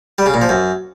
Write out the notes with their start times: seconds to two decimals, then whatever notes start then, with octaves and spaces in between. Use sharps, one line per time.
0.18 G3
0.26 C#3
0.34 A#2
0.42 F3
0.49 F#2